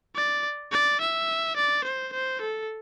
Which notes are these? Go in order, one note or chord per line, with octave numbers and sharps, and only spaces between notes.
D5
D5
E5
D5
C5
C5
A4